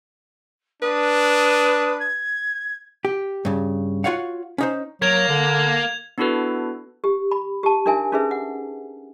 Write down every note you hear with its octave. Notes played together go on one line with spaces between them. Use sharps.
D4 B4 D#6
G#6
G4
G2 C#3
F4 F#4 C#5 F5 F#5
C#4 D#4 C5
F#3 A#3 G#6 F7
D3
B3 D4 E4 F#4 A4 B4
G4
B5
G4 A5
D4 D#4 A#4 E5 G#5
C#4 D#4 G#4 B4 E5
F#5